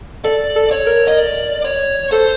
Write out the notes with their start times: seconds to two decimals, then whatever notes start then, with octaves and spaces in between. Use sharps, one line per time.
0.24 A4 D5
0.56 A4
0.71 C#5
0.87 A#4
1.08 D#5
1.18 D5
1.65 C#5
2.11 A4 C5